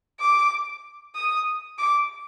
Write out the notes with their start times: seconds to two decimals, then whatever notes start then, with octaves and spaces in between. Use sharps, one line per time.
0.20 D6
1.15 D#6
1.78 D6